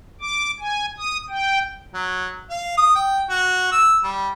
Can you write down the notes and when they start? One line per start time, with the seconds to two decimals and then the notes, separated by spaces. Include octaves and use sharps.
0.21 D6
0.60 G#5
0.98 D#6
1.29 G5
1.94 F#3
2.50 F5
2.78 D#6
2.95 G5
3.30 F#4
3.72 E6
4.04 G3